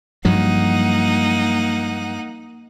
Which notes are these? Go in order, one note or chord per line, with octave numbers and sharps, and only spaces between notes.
G2 F3 F#3 A#3 D#4 F#5